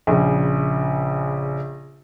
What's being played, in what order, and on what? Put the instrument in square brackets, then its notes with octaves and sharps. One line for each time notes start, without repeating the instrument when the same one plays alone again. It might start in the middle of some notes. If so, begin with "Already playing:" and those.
[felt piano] A#1 C#3